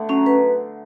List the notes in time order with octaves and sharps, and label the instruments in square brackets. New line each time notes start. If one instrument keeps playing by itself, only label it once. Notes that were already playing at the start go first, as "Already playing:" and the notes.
Already playing: [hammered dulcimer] D3 A3 B3
[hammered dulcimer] F#3 [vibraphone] C#4
[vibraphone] B4